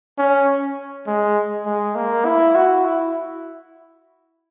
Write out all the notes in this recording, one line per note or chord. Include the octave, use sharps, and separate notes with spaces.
C#4
G#3
G#3
A#3
E4
F#4
E4